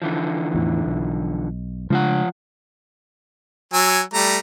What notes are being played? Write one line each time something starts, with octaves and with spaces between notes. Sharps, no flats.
D3 E3 F3
E2 A2
B1
C#3 F3 G#3 D4 F4 F#5
F#3 G#5 E6
G3 A3 A#5